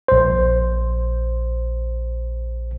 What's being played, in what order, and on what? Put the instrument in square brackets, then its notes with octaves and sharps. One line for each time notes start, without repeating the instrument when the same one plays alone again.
[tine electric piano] A#1 C5